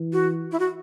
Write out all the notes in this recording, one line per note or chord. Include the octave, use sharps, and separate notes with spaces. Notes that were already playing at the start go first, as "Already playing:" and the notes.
Already playing: E3
F#4
E4
F#4